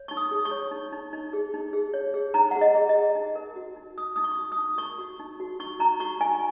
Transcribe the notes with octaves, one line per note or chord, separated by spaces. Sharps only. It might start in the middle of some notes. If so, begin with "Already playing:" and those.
Already playing: C#5
D#4 C#6
D#6
G#4
C#6
C#5
D#4
D#4
D#4
G#4
D#4
G#4
C#5
G#4
D#4 A#5
G#4 F#5
D#5
G#4
D#5
G#4
D#4
A#4
F#4
D#4
D#4 D#6
D#4 D#6
C#6
F#4
D#6
D#4
A#4 C#6
F#4
D#4
F#4
D#4 C#6
D#4 A#5
F#4 C#6
D#4 G#5